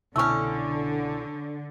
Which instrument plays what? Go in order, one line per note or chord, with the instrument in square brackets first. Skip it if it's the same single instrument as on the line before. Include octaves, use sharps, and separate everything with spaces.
[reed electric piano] C2 B2 E4 [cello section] D3 [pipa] A3 C#4 [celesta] C#6 E6